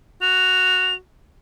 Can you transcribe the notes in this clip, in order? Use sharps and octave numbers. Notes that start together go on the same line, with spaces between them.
F#4 F7